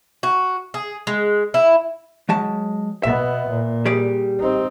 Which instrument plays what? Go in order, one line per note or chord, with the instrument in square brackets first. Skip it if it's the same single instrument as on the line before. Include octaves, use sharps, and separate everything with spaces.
[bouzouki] F#4
G#4
G#3
E4
[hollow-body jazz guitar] F#3 G#3 A5
[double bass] B2 B3 [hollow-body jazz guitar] E5
[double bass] A#2
[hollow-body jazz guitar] G3 G#4 D5
[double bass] C4 D#4